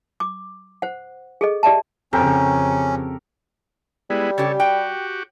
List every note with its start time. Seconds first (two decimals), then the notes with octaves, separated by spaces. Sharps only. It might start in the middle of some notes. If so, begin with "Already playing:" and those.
0.20 D6
0.82 C5 F#5
1.41 G#4 A4 D#5
1.63 G4 D5 E5 A5
2.13 F2 C#3 C4 C#4 G4 A4 A#4 G5
4.10 G3 G#3 B3 E4
4.38 C#3 G4 A4 C#5
4.60 F#4 G4 G5